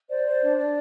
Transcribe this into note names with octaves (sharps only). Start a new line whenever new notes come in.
C5 D5
C5
D4
D4